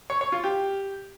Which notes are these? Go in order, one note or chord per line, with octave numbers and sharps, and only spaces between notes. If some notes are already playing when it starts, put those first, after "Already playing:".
C#5
C#5
F4
G4